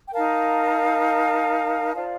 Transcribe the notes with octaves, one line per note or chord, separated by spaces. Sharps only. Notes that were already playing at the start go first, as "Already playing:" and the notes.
G5
D#4 A#4 F5 A5
F4 C5 D5 F5